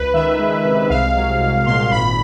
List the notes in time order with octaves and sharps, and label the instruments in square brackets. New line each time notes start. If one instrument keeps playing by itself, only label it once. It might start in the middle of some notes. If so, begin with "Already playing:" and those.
Already playing: [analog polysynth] C#2 B4
D#3 E5
G#3
C3
C2 F5
F#3
C2
A#2 C6
G#1 B5